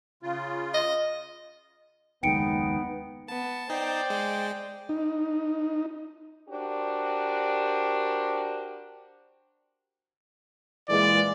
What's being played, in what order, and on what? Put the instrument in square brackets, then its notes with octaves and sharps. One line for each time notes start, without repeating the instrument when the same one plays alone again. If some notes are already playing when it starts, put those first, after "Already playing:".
[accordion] C#3 F4
[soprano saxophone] D#5
[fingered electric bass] F#1 D#2 G#3 [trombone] B3 [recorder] D#4 [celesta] G5 C#7 D7
[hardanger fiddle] B3 [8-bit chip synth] A5
[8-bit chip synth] D#4 [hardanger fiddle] C5 D5 [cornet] G5
[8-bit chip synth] G#3
[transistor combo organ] D#4
[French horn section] D4 F#4 G4 A#4 C5
[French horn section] A#2 E3 G#3 [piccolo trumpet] D5